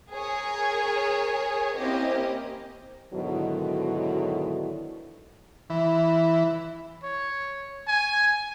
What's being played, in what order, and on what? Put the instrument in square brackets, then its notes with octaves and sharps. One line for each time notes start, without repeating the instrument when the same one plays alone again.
[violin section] G#4 A#4 C#5 G#5
A#3 C4 C#4 E4 G4 D#5
[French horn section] G#2 B2 D3 D#3 F#3 E4
[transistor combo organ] E3
[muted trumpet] C#5
G#5